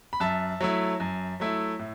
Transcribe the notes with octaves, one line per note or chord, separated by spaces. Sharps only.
B5
F#2 E5 A5
F#3 A3 E4
F#2
F#3 A3 E4
A2